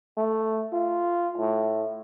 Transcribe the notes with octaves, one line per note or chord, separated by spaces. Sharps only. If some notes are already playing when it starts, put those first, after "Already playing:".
A3
F4
A2